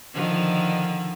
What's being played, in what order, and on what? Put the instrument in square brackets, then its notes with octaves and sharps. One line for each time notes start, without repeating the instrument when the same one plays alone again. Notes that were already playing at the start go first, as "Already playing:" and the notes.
[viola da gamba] D3 D#3 F3